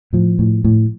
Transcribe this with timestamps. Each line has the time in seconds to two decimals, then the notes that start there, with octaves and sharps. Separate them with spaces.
0.13 A2 F3
0.39 A2
0.64 A2